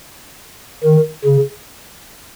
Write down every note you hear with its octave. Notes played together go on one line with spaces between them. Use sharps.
D#3
C#3